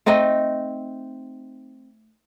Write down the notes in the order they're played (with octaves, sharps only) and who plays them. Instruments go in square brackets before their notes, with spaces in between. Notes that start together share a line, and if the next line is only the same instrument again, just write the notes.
[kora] A3 C4 D#4 D#5